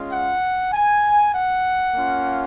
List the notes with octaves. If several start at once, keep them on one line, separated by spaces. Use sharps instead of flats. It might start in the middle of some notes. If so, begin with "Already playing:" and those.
Already playing: G#3 C#4 F4
F#5
G#5
F#5
A#3 C#4 F4